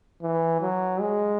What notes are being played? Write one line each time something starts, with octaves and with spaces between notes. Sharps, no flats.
E3
F#3
G#3